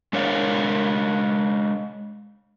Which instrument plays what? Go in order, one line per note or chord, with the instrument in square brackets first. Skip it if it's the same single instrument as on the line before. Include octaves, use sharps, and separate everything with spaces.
[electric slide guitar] G#3 D4 A#4 C#5 D5 F5